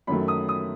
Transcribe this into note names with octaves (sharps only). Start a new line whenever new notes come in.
F#2 D#3 F#3 A3 B5
D#6
D#6